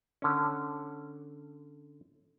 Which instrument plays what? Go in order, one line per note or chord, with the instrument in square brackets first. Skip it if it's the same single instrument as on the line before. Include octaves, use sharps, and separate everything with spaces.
[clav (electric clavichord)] D3 C#4